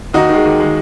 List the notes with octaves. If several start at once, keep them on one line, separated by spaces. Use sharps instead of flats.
D#2 D#4 F#4
D#3 G#3
D#2
D#3 G#3